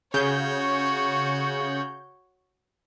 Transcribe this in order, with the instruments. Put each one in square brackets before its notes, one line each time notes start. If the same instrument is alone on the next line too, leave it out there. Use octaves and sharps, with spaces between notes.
[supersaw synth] C#3 G6 [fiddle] F#4 C#5